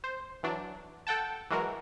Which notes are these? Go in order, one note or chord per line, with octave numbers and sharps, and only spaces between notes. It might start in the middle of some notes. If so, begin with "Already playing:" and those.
C5
E3 F#3 D4
A4 F#5 G5 A5
E3 F#3 G#3 F#4 A#4